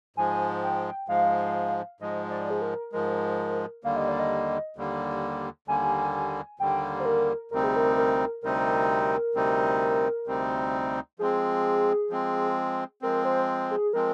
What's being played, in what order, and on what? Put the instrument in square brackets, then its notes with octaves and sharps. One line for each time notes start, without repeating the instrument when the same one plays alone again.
[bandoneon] G#2 F3 G#3 [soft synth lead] G#5
[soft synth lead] G5
[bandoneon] G#2 F3 G#3 [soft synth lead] F5
[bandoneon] G#2 F3 G#3 [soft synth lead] D#5
[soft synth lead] D5
G#4
A#4
[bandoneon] G#2 F3 G#3 [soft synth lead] A#4
[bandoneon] D#2 D3 G3 A#3 [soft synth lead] F5
[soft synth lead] D#5
D5
D#5
[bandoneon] D#2 D3 G3 A#3
[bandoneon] D#2 D3 G3 A#3 [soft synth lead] G#5
[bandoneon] D#2 D3 G3 A#3 [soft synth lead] G5
[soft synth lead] C5
A#4
[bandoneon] D2 C3 G3 C4 D#4 [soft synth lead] A#4
[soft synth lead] G#4
A#4
A#4
[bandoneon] D2 C3 G3 C4 D#4 [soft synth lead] A#4
[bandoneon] D2 C3 G3 C4 D#4
D2 C3 G3 C4 D#4
[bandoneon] F3 G#3 C4 [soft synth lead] G#4
[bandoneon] F3 G#3 C4
[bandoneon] F3 G#3 C4 [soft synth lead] A#4
[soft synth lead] C5
G#4
[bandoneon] F3 G#3 C4 [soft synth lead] A#4